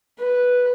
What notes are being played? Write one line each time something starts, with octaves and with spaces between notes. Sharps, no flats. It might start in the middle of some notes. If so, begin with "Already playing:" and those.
B4